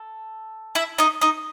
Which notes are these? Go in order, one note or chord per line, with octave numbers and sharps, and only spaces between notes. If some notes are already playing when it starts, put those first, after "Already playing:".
Already playing: A4
E4 E5
D#4 D#5
D#4 D#5